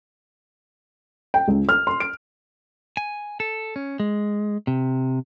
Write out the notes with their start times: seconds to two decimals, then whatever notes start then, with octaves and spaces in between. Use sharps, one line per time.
1.34 G5
1.48 C#2
1.69 F6
1.87 C6
2.00 D7
2.97 G#5
3.40 A4
3.76 C#4
4.00 G#3
4.67 C3